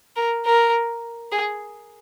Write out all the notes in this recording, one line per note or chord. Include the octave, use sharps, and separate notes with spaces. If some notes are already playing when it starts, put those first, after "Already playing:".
A#4
A#4
G#4